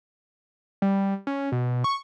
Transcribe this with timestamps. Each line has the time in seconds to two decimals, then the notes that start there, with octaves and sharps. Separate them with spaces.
0.82 G3
1.27 C#4
1.52 B2
1.84 C#6